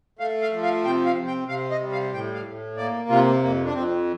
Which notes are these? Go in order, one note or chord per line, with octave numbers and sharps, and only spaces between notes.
A3 F5
F5
F3
F5
C3 G5
F5
C3
G5
C3 F5
D#5
G3
F5
A2 G5
F5
A2
A#3 D5
C3 F4
F2 A#3
D4
F2 C4